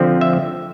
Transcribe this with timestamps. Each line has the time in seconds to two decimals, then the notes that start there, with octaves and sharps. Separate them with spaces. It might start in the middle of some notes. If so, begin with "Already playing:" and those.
Already playing: D3 F3 C4
0.21 E5